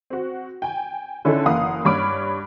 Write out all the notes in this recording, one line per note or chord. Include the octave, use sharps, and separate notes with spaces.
C4 F#4
G5 G#5
D3 C#4 D#4 E4 A4
F#1 E3 A#4 F5 F#5 D#6
G2 C#5 B5 D6 F6 D7